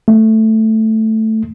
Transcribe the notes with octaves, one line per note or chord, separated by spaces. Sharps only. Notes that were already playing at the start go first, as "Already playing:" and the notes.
A3